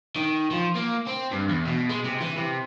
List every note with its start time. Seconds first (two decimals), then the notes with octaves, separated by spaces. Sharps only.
0.16 D#3
0.51 F3
0.75 A#3
1.07 C4
1.31 G2
1.49 E2
1.66 B2
1.89 G#3
2.04 C3
2.20 E3
2.36 C3